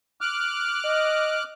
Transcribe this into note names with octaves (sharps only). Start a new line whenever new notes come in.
D6 F6 F#6
D#5